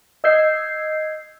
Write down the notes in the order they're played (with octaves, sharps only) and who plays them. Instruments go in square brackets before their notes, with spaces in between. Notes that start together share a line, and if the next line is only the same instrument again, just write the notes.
[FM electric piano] D#5 E6 G6 G#6 C7